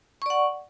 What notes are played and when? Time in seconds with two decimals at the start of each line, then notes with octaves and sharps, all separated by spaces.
0.22 C#6
0.26 D5
0.30 F#5